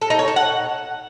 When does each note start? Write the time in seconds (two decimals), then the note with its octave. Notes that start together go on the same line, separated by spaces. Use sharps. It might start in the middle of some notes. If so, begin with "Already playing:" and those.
0.01 A4
0.10 D#4
0.19 C#5
0.28 A4
0.36 F#5